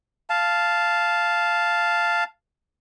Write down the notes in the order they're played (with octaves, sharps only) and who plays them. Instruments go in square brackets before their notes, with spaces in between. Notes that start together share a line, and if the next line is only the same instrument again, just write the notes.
[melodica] F5 A5